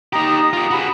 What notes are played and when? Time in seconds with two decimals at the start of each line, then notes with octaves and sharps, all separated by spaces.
0.13 D#4 G4 A#5 D#6
0.38 D#6
0.53 F4 G4
0.71 F#4 G#4 B5